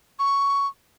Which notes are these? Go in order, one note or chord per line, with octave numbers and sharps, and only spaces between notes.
C#6